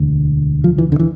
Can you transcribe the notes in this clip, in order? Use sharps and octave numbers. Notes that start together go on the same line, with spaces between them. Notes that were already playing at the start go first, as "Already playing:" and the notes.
Already playing: E1 D2 D3
F3
E3
D3
E3